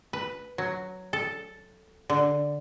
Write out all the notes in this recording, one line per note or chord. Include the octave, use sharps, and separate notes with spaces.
B4
F#3
A4
D3